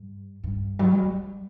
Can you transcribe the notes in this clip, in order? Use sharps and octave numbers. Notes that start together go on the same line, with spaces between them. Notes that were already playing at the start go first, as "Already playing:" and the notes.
Already playing: G2
G2
F#3
G3
G3